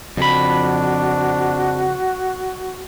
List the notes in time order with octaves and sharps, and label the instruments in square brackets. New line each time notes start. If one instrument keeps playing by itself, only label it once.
[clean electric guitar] F2 B5 [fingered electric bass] C#3 F3 [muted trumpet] D4 [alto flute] F#4